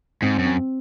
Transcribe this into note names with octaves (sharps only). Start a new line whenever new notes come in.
G#2 C4
F#2
C4